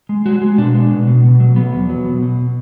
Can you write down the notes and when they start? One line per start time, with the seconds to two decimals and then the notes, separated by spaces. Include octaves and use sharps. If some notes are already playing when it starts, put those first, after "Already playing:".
0.09 G#3
0.26 G#3 F#4
0.42 G#3
0.58 B2 D4
0.74 G#3
0.91 B2
1.07 B2
1.24 B2
1.40 F#3
1.56 F#3 B3
1.73 E2
1.89 F#3
2.05 B2
2.22 B2